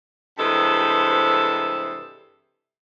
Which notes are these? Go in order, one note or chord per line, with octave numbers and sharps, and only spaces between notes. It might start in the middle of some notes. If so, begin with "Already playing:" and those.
G2 C3 E3 G#3 A4 C5